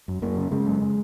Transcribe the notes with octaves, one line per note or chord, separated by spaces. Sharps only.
F#2
F#2 A#3
C#3
C#3 G#3
F#2